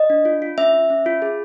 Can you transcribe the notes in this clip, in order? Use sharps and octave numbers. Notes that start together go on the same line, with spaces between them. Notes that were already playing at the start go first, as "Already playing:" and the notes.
Already playing: D#5
D4
F4
F4
C#4 E5
C#4
C#4
F4
G#4